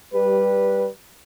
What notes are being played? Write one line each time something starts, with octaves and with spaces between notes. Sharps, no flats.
G3 B4